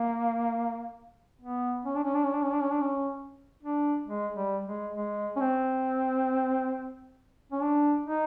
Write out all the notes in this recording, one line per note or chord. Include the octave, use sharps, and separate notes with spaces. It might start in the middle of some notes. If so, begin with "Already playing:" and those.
Already playing: A#3
B3
C#4
D4
C#4
D4
C#4
D4
C#4
D4
C#4
D4
C#4
D4
G#3
G3
G#3
G#3
C#4
C4
C#4
D4
D#4